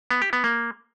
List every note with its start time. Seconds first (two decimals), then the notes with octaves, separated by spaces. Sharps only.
0.11 B3
0.22 G4
0.33 B3
0.44 A#3